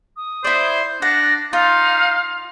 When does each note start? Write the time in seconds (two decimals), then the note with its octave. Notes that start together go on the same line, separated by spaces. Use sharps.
0.16 D#6
0.44 E4 C5 D5
1.02 D4 F#5 A#6
1.53 D#4 F4 F5